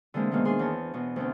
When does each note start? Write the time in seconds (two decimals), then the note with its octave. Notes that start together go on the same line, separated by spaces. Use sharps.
0.14 D3 E3 G#3 A#3 C4
0.31 B2 D#3 G#3 A#3 B3 D#4
0.45 D#3 D4 G#4 G#5 C6
0.59 E2 C#5 A5
0.94 E2 B2
1.16 D2 B3 C4